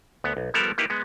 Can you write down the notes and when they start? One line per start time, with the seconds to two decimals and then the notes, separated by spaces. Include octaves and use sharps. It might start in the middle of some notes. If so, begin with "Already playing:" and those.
0.24 D2 B3
0.37 B1
0.54 F3 G3 B3 A4 A#4 D5
0.78 A#3 D#4 E4 G4 B4
0.90 G#3 B3